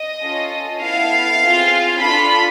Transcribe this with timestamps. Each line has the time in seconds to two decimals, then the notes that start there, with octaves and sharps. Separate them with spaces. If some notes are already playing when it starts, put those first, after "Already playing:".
Already playing: D#5
0.23 C#4 F4 A4
0.82 B3 E4 A4 F5
1.42 C4 F4 G#4
2.01 D4 F4 A4 B5